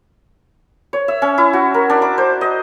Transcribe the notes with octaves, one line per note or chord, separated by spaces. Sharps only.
C#5
E5
C#4
E4
F#4
A#4
D4
D6
C5
D#5